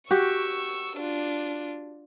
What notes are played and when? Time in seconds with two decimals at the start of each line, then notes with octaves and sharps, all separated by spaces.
0.11 F#4 G4 C#6 E6
0.97 D4 F4